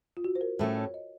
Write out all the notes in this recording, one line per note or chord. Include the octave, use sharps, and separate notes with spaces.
F4
F#4
C5
A#4
A2 A3 C#4 C5
C#5
D#5